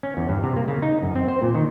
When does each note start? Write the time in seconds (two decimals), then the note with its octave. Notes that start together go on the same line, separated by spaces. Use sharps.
0.03 C#4
0.17 E2
0.29 G2
0.43 C3
0.56 A#3
0.68 C#3
0.82 D#4
1.03 F#2
1.15 C4
1.28 C5
1.42 A#2
1.55 D#3